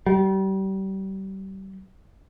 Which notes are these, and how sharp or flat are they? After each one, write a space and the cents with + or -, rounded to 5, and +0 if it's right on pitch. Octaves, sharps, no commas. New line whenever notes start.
G3 -30